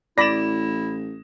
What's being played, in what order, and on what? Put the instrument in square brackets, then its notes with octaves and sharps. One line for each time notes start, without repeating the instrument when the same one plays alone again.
[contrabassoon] A1 [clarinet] E4 [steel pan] D5 B5 [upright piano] A#6 E7